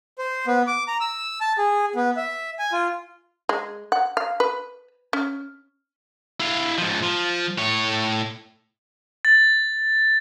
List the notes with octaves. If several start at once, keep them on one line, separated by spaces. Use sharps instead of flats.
C5
B3
D6
A#5
E6
A5
G#4
B3
E5
G#5
F4
G#3
F#5
F5
B4
C#4
E4 F5
G#2 F3
F3
A2 C#5
A6